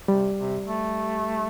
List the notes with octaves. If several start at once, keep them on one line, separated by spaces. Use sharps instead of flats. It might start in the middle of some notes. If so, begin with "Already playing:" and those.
C3 G3
C3
A3